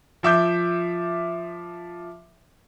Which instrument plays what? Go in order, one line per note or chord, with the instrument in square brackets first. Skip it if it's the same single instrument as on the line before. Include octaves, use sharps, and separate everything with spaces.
[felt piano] F3 E5 D6 G6